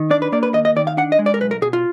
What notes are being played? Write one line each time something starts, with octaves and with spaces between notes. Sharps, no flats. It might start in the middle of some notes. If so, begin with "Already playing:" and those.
Already playing: D#3
D4 D5
B4
A#3 D5
B4
D#2 D#5
D#5
D#3 D5
F5
D4 F#5
D#5
G#3
D5
A#4
B1 B4
A#4
B2 G#4
F4